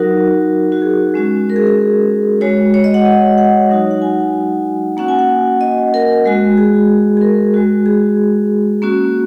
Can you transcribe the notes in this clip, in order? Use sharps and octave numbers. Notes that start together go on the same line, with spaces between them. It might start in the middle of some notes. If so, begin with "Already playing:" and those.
Already playing: F#3 D#4 F#4 A#4
F#4
G#4
G#3 C#4 F#4
A#4
G#4
G#4
G#3 F#4 C#5
C#5
D#5
F#5
D#5
F#5
F#3 D#4 F#4
F#5
G#5
A#3 C#4 F#4 F#5
G#5
F#5
D#5
A#4
G#3 F#4
G#4
G#4
A#4
G#3 F#4
G#4
A#3 C#4 F#4